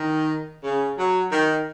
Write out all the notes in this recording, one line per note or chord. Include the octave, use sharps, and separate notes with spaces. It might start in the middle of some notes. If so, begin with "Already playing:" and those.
Already playing: D#3
C#3
F#3
D#3